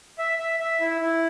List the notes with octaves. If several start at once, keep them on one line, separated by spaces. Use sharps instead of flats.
E5
E5
E5
E4
E4